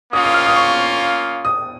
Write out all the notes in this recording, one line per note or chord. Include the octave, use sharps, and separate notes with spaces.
A#3 C#4 F4 D#6
D#6
F6
D#6
C#6
D#6